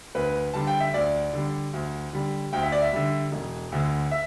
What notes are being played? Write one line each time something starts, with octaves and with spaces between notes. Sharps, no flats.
D2 B4
D3 G3 A5
G5
E5
D2 D5
D3 G3
D2
D3 G3
D2 G5
E5
D5
E5
D3 G3
E1
D2 D3
E5